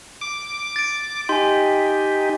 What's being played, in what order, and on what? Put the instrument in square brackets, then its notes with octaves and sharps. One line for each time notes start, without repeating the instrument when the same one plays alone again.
[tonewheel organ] D6
[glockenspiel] A6 D7
[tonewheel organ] D#4 G4 [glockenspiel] G#5 C6